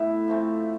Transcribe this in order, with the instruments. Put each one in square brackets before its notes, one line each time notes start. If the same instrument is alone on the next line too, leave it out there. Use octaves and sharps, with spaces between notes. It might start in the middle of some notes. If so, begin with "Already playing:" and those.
Already playing: [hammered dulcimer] A2 B3 [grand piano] E5
[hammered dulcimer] F3 A3 C4